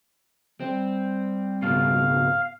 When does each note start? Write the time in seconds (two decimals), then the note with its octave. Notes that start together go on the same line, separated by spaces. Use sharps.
0.60 G3 C4
1.62 C#2 G#2 B2 F5